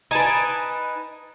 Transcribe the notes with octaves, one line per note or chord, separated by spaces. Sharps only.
D#4 B4 G#5 A5 D7